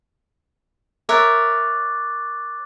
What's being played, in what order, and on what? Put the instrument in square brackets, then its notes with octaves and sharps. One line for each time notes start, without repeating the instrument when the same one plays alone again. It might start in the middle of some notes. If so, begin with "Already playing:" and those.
[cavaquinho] A#4 C#5 E5 [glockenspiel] D6 F#6 A6